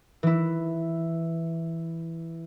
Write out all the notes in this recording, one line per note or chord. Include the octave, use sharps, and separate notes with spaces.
E3 E4